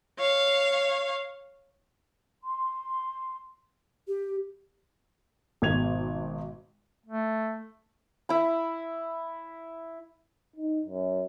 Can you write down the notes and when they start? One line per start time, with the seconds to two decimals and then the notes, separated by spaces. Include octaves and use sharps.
0.19 C#5 F5
2.44 C6
4.08 G4
5.62 G#1 B2 G#6 F7
7.06 A3
8.29 E4 B5
10.56 D#4
10.86 F#2